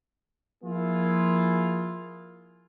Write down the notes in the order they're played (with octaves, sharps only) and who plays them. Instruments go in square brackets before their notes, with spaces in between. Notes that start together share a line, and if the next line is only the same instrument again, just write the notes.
[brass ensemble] F3 A#3 E4 F4 G#4